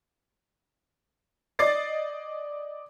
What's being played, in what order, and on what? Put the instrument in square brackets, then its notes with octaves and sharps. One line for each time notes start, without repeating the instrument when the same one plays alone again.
[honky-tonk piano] D5 D#5 D6 A6 C7